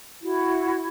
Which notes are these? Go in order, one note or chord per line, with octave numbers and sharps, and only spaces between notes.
E4 F#4